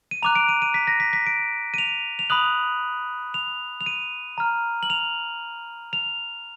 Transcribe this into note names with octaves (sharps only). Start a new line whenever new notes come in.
D#7
A#5 D6 F#6 F7
D7
D#7
D#7
B6
A#6
B6
B6
D7
D#7
F7
F7
B5 D#6 F#6 F#7
F7
F7
D#7
A#5 F6
F#7
F7
F7